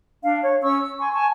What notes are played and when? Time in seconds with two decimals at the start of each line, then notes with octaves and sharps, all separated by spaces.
0.23 D4 F5
0.42 C#5
0.62 C#4 C#6 E6
0.81 E6
0.98 G#5 C6 C#6
1.12 G#5 A5 C#6